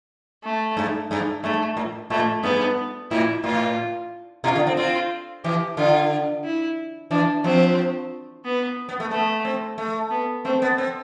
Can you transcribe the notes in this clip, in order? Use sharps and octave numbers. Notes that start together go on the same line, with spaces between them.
A3
G2
G2
G2 A3
A2
A2 A3
G2 B3
A2 E4
A2 F4
B2 F4
D3
C4
C4 F4
E3 G4
D3 F4
E4
E3 D4
F3 C4
B3
B3
A3
A3 B3
C4
A3
B3
A3 C4
B3
C4